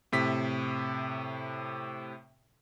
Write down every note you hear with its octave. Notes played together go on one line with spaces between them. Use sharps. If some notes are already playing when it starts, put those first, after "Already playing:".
A2 C3 B6